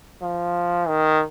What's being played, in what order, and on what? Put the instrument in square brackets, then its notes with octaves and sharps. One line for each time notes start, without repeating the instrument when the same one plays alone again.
[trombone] F3
D#3